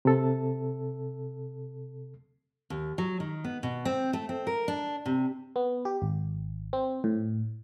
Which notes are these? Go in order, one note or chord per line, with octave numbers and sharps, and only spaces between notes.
C3 A4
D#2
F#3
D#3
B3
B2
C4
A3
C4
A#4
D4
C3
B3
G4
G#1
C4
A2